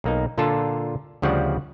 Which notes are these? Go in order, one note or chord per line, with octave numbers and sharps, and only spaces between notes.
B1 A#3 D#4
A#2 D3 F4 A4 A5
D2 C#3 F3 G3 D5 F#5